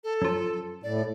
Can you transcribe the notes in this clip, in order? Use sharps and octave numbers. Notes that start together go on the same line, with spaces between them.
A4
F#2 F3
A2 D5